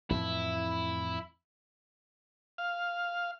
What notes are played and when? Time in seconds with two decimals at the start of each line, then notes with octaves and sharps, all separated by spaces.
0.10 F2 A2 E3 E4
2.58 F5